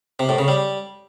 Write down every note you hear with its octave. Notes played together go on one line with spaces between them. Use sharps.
C3
A2
C#3
G3